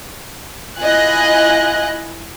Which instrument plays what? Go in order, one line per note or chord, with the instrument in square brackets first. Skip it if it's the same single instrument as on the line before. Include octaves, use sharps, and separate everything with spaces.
[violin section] E4 F4 D#5 G#5 F#6